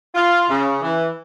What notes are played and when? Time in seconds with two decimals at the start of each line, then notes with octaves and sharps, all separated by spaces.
0.15 F4
0.49 C#3
0.82 E3